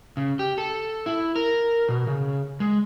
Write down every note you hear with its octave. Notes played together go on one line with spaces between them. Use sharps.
C#3
G4
A4
E4
A#4
B2
C#3
G#3